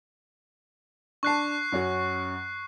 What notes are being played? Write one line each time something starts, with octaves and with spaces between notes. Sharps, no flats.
D4 A5 C#6 F#6 C7
F#2 C#4 F#4